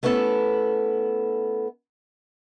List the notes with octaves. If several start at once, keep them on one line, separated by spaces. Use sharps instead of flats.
A3 B3 C#4 E4 A4